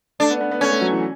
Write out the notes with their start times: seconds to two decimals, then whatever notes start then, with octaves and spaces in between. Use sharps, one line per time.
0.20 A3 D4
0.30 B3
0.40 B3
0.51 B3
0.61 A3 C#4
0.71 A3
0.81 F#3
0.92 E3